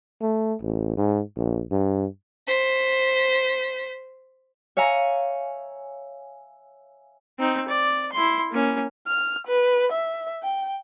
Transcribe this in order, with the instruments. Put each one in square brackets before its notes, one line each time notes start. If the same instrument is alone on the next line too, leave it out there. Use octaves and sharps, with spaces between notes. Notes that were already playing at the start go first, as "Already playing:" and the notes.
[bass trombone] A3
A1
G#2
A#1
G2
[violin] C5 B6
[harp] C#5 E5 F5 G#5 A#5
[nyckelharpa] C4 D#4
D5
E4 C6
A#3 C#4
[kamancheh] F6
B4
E5
G5